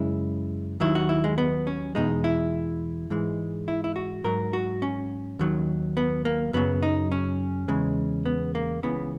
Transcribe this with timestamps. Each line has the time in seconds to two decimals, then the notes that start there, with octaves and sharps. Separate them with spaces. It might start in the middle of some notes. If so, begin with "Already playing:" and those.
Already playing: F#2 C#3 G#3 E4
0.80 D#2 D#3 F#3 E4
0.95 F#4
1.09 E4
1.24 G#3
1.38 B3
1.67 C#4
1.95 E2 B2 G#3 D#4
2.24 E4
3.10 G#2 E3 G#3
3.68 E4
3.84 E4
3.96 F#4
4.24 G#2 F#3 A#4
4.53 F#4
4.82 C#4
5.39 D#2 D#3 F#3
5.97 B3
6.25 A#3
6.53 F#2 C#3 F#3 B3
6.83 D#4
7.12 C#4
7.68 E2 C#3 G#3
8.25 B3
8.55 A#3
8.83 C#2 C#3 E3 B3